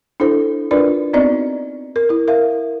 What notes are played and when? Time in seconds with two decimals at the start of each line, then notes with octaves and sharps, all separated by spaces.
0.20 D4 E4 A4 C5
0.71 D4 D#4 F4 A#4 B4 D5
1.13 B3 C4 D#4 F#4 D5 D#5
1.96 A#4
2.09 E4 A#4
2.28 A#4 E5 F5